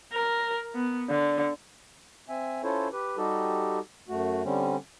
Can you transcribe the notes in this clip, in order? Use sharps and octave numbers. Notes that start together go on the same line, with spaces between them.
A#4
B3
D3
C4 E5 G#5
C#4 E4 F4 A4 C5 C#5
G4 B4
G3 D#4 F#4 G4 A4
F#2 A3 F#4
D3 G3 C4 C#4